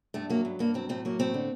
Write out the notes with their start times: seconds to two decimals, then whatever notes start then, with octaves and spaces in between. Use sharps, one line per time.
0.14 G2 A3
0.30 F#3 A#3
0.45 G2
0.59 G2 A#3
0.74 F#3 C4
0.89 A2 C4
1.05 F#3 A#3
1.19 A2 C4
1.34 D3